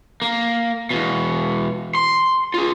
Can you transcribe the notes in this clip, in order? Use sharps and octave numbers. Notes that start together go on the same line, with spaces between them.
A#3
E2 B2
C6
F4 G#4